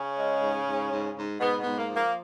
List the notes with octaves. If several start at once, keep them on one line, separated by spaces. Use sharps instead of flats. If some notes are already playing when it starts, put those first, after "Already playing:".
Already playing: C#3 C#4
G#3
G#2
G#2
G#2
G#2
G#2 B2 B3
B2 B3
G#2
A#3
F3
A#3